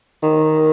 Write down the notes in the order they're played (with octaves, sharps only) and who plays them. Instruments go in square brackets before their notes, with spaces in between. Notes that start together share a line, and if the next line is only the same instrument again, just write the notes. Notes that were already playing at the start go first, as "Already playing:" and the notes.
[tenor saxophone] D#3